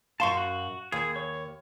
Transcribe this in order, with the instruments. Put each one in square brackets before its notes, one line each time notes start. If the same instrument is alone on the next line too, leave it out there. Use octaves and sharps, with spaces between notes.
[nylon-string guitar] F#2 F5 [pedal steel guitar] A5 C6 C#6
[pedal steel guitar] F#4
[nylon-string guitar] D#2 [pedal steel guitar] G#4
[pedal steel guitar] C#5